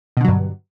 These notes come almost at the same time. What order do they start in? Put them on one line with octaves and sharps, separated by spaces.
B2 D3 F#3 G2